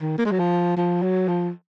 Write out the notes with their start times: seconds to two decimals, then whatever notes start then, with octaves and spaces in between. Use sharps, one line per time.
0.01 D#3
0.18 A#3
0.25 G#3
0.32 F#3
0.39 F3
0.77 F3
1.03 F#3
1.28 F3